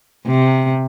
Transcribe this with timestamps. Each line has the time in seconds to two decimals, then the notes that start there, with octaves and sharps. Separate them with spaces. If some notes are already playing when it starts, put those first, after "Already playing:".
0.26 C3